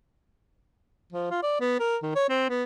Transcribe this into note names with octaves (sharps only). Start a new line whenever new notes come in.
F3
F4
D5
B3
A#4
D#3
C#5
C4
B3